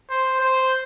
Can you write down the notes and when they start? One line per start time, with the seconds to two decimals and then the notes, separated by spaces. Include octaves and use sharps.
0.10 C5
0.41 C5